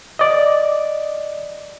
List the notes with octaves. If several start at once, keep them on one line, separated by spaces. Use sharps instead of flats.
D5 D#5